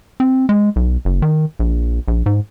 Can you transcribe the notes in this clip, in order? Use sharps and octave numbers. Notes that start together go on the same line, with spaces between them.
C4
G#3
B1
F#1
D#3
A#1
A#1
G#2